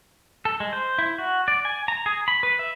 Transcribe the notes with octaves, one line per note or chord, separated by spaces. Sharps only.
A4
G#3
C5
E4
F#4
D5
G#5
A#5
G#4
B5
B4
E5